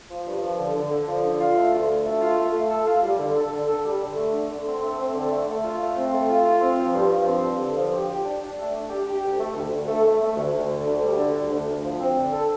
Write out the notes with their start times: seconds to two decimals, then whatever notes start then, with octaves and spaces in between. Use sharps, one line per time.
0.09 F3
0.26 G2
0.42 F3
0.58 D3
0.74 D3
0.91 D3
1.08 F3
1.24 D3
1.39 F4
1.56 A3
1.73 D2
1.89 A3
2.05 A3
2.21 F4
2.38 A3
2.53 A3
2.71 A4
2.86 F4
3.02 G3
3.19 D3
3.36 A4
3.52 D3
3.68 A4
3.84 G3
4.01 D3
4.17 A3
4.34 D3
4.50 D3
4.67 C4
4.83 A3
4.98 C4
5.14 D3
5.32 A3
5.48 A3
5.64 F4
5.80 A3
5.96 C4
6.13 A3
6.30 F4
6.45 F4
6.61 C4
6.79 F3
6.95 G2
7.11 F3
7.27 C4
7.43 G2
7.59 D3
7.76 F3
7.93 G4
8.08 G4
8.24 D4
8.42 D4
8.58 A3
8.74 D4
8.90 G4
9.06 G4
9.23 D2
9.39 A3
9.55 D2
9.71 D2
9.88 A3
10.05 A3
10.21 A3
10.36 D2
10.53 D2
10.70 D3
10.86 D2
11.03 G3
11.18 D3
11.34 D2
11.50 D2
11.68 D2
11.83 F3
12.01 C4
12.16 D3
12.33 A4